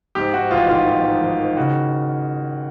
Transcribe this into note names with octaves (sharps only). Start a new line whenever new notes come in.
G#2 G4
G#2 F#4
A1 F4
D#3 F4
A1
G#2
D#3
D#3
C#3 F#4